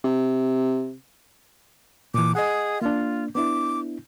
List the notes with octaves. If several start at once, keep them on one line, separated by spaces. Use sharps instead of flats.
C3
A#2 E3 D6
G#4 D#5 F#5
A#3 D4 F4
B3 D4 E4 D6